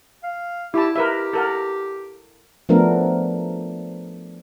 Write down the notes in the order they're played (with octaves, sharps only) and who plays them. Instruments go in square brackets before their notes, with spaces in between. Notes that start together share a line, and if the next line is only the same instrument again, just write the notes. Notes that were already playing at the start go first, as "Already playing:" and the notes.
[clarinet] F5
[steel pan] E4 A5 [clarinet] G4
[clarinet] G4 [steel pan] A#4 B4 E5
[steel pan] A4 A#4 F#5
[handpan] F3 A3 B3 D4 A#4